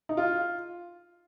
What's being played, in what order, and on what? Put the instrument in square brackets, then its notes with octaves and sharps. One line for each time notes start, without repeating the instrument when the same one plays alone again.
[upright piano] D#4
F4